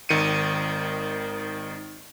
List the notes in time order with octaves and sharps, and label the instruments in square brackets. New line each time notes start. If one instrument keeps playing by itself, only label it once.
[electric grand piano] G#1 D#3 C#7 D#7